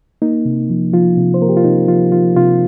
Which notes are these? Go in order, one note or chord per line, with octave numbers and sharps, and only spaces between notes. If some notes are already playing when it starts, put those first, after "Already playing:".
A#3 D#4
C3
F3
F3 F4
C3
C5
A#3 A#4
G4
F4
C3 D#4
F3 F4
F3 F4
C3 F4